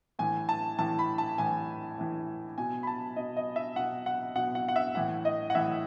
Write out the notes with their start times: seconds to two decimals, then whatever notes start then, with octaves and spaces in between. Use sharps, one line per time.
0.19 A2 E3 G#5
0.49 A5
0.79 A2 E3 A5
0.99 B5
1.18 A5
1.38 A2 E3 G#5
1.98 A2 E3
2.58 B2 G#5
2.83 B5
2.87 A5
3.16 B2 D#5
3.37 D#5
3.56 E5
3.76 B2 F#5
4.06 F#5
4.35 B2 F#5
4.55 F#5
4.68 F#5
4.76 E5
4.95 A2 E3 F#5
5.25 D#5
5.50 F#5
5.55 A2 E3 E5